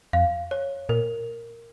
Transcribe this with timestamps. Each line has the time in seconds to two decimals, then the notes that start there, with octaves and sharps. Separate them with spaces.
0.13 F2 F5
0.51 C#5
0.89 A#2 A#4